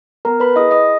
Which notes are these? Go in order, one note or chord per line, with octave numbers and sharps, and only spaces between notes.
B3 A#4 A#5
B4 B5
E4 G#4 D#5 D#6
D#5 D#6